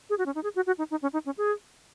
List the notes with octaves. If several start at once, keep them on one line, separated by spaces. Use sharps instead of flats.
G#4
F#4
C#4
D#4
G#4
F#4
F#4
D#4
D#4
C#4
D#4
C#4
G#4